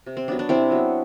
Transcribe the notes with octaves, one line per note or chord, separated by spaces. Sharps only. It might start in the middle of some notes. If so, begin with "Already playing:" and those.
C3
C4
F#3 B3 D4
D4
C3 C4 E4
F#3 B3